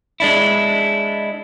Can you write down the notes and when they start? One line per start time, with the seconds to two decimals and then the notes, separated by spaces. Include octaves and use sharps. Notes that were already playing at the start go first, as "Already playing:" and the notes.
0.20 G#3 D4 E4